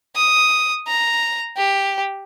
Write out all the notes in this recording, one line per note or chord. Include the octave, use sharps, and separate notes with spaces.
D#6
A#5
G4